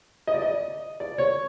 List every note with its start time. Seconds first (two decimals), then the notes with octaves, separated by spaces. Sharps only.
0.27 D#5
0.34 D5
0.42 D#5
1.00 D5
1.18 C#5